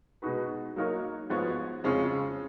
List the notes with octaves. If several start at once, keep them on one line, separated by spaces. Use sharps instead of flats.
B2 G#3 D#4 F#4 B4
F#3 A#3 D#4 A#4 C#5
G#2 F3 B3 F#4 C#5
F2 C#3 G#3 C#4 F4